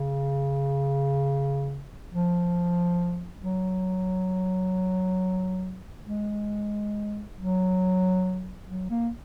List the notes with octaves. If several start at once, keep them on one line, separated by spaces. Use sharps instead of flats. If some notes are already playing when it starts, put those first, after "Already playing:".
Already playing: C#3
F3
F#3
G#3
F#3
F#3
A#3